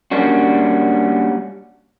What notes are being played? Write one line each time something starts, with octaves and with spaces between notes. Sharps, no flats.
G3 A#3 C#4 D4 F#4